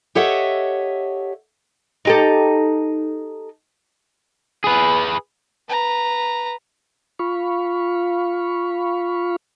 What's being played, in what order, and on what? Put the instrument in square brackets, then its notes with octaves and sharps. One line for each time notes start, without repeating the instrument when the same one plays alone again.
[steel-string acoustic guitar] G4 A4 C#5 D#5 E5 F#5
[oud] D#4 G4 A4
[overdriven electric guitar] G#4 B4
[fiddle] B4 A#5
[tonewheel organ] F4 F5 B5 C#6